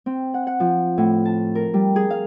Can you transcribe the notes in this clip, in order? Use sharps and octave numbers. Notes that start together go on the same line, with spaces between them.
C4
F#5
F#5
F3
A2
A5
A#4
G3
G#4
F5